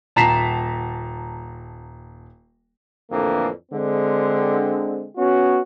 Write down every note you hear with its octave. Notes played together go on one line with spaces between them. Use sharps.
D#1 A5 A#5 B6 C7 E7
F2 A2 D3 E3 A#3 D4
D3 G#3 C4
B3 C#4 F#4